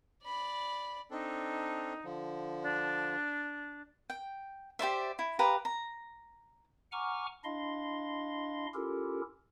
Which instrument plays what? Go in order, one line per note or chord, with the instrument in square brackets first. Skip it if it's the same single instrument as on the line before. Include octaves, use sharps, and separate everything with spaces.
[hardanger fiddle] D5 B5
[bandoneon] C4 D4 A4 [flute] D#4
[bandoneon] D3 F3
[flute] D4
[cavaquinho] G5
G4 C5 D5 E5
E4
G4 B4 F5 A#5
A#5
[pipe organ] F#5 G#5 A#5 C#6 D6 F6
D4 E4 D#5 F5 C6
C#4 E4 F4 G4 A4 A#4